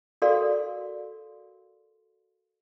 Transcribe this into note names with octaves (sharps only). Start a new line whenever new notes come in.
F#4 A4 A#4 D5 F5 C6